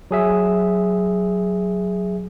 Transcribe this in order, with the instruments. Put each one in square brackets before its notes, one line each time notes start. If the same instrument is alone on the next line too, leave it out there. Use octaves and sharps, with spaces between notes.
[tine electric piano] F#3 G#4 E5